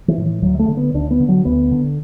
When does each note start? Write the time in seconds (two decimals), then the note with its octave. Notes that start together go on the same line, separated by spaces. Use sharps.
0.08 E3
0.18 A2
0.26 E3
0.42 D2 F#3
0.59 A3
0.68 D3
0.77 B3
0.94 D2 D4
1.11 B3
1.20 D3
1.28 F#3
1.45 D2 B3
1.71 D3